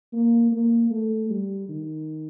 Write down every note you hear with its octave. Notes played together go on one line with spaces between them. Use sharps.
A#3
A#3
A3
G3
D#3